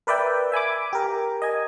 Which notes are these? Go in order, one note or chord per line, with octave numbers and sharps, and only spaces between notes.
A#4 B4 D5 E5 G5
E5 G#5 B5 D6
G4 A#4
D#5 G#5